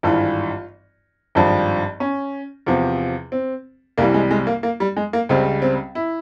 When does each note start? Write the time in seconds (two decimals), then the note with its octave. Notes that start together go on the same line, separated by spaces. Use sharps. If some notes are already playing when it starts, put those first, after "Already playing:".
0.03 G#1 G2 E3 F4
1.35 G#1 G2 F3
2.00 C#4
2.66 E2 C3 F3
3.32 C4
3.97 C2 C3 E3 G3 A#3
4.14 G#3
4.31 G#3
4.47 A#3
4.63 A#3
4.80 G3
4.97 G#3
5.13 A#3
5.29 C#2 C#3 G3 C4
5.62 C4
5.95 E4